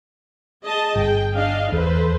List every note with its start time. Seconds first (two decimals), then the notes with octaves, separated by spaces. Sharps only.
0.64 G#4 D#5 A5
0.95 G1 G#4 G5
1.35 D4 D#5 F5
1.72 E2 A4 B4 C5